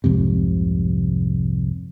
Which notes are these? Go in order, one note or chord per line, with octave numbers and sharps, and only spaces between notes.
C2 F2 G#2 C3